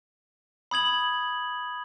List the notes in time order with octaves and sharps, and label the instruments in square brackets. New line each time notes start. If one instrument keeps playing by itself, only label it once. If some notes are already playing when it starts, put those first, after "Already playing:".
[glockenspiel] B5 D#6 G#6 F#7